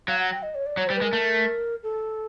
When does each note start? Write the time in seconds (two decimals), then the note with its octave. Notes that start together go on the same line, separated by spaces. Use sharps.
0.08 F#3 F5
0.19 F#5
0.31 G5
0.43 D#5
0.55 C#5
0.66 D5
0.77 F#3 C#5
0.87 C5
0.90 G3
0.95 B4
1.01 G#3
1.04 A#4
1.13 A3
1.83 A4